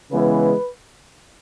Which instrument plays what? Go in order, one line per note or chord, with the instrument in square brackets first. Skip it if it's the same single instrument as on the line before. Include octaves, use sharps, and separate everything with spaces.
[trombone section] C#3 E3 G#3 B3 B4